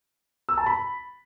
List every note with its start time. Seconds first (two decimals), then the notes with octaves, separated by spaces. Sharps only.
0.49 E6
0.57 A5
0.66 B5